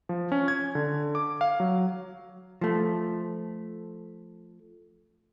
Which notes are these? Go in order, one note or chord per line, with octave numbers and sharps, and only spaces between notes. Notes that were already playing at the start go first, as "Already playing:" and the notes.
F3
C#4
G#6
D3
D6
F5
F#3
F3 A3